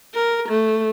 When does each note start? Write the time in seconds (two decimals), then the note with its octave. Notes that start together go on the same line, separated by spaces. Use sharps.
0.14 A#4
0.49 A3